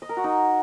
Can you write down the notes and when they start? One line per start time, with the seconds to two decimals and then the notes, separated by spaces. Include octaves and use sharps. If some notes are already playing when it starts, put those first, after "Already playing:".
0.02 D#5
0.09 A#4
0.17 F#4
0.24 D#4